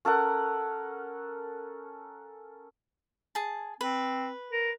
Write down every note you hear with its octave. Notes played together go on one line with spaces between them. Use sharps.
C#4 A4 A#4 F#5
G#4 A5
C4 B4
A#4